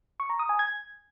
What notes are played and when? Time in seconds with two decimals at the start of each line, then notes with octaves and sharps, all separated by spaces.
0.20 C#6
0.30 A#5
0.39 D#6
0.49 G#5
0.59 G#6